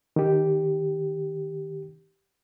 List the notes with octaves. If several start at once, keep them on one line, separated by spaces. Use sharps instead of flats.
D#3 G4